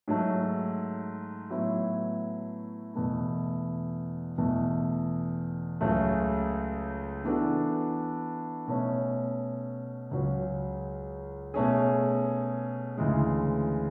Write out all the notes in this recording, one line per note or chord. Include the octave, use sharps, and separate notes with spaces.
G#2 F#3 A3
A2 F#3 B3 E4
E2 B2 A3 E4
E2 B2 A3
C#2 C#3 F#3 A3
E3 B3 D4 F#4 A4
B2 A3 C#4
C#2 C#3 F#3 C#4 F#4
B2 A3 C#4 G#4
D2 C#3 E3 G#3